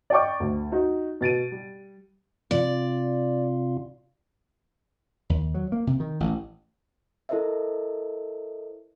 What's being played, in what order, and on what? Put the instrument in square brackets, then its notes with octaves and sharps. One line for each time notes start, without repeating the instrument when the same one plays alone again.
[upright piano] D5 D#5 G5 C#6 D6
D2
D#4 F#4
B2 A6 D7 D#7
G3
[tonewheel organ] C3 F4 [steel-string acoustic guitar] D5
[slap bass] D#2
F#3
A#3
C3
D#3
A1
[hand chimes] E4 A4 A#4 C5 D#5 E5